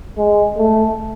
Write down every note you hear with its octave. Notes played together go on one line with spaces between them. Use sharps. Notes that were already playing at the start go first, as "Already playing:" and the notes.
G#3
A3